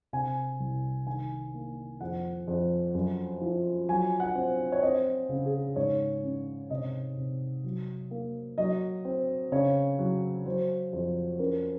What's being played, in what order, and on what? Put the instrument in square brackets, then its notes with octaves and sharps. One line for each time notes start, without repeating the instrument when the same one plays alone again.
[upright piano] C3 G#5
C2
D#3 G#5
A#3
F2 F#5
F2
F#2
F3
F#3 G#5
F#5
C4
C#5
C4 D#5
C#3
G#4
G#2 C#5
C#4
C3 D#5
C3
F#3
A#3
F#3 D#5
C4
C#3 C#5
F#3
F#3 C5
F2
C#4 A#4